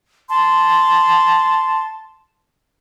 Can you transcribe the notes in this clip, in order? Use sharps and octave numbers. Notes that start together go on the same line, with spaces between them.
A5 C6